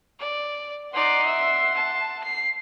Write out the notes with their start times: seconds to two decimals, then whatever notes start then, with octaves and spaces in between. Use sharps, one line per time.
0.19 D5
0.94 D#4 D5 F#5 C6
1.26 E5
1.74 A5
2.24 C7